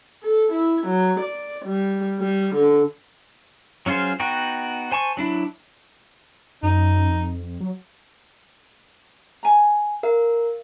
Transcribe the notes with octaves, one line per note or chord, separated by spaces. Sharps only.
A4
E4
F#3
D5
G3
G3
D3
F#3 C#4 F4 G#4 C5
B3 D#4 F#4 G5
C5 G#5 A5 C#6
F#3 D4 E4
F#2 D#4
F2
F#3
G#5 A#5
A#4 F5